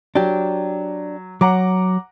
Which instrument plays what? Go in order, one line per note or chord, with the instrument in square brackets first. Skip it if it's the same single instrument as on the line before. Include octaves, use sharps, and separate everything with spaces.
[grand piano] F#3 [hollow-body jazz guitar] D4 G4
[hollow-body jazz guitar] F#3 [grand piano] F#5 A#5 D6